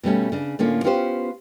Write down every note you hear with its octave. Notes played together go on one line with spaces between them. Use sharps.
B2 G3 A3 C#4
C#3 D4
A2 D3 A#3 C#4 F4
B3 C#4 F4 G4 A#4 C5